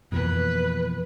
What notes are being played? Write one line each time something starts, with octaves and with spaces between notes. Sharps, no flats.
F2 B2 E3 A#3 B4